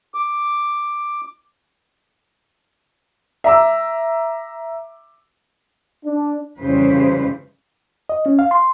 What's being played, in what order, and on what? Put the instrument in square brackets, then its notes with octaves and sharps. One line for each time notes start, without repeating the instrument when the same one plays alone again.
[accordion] D6
[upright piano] E5 A#5 D6 E6
[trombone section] D4
[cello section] F2 C#3 E3 G3 B4 C5
[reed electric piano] D#5
C#4
F5
C6